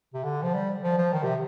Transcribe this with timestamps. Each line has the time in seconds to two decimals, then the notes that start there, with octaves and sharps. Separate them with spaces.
0.14 C3
0.24 D3
0.43 F3
0.54 G3
0.83 F3
0.98 F3
1.12 D#3
1.23 C3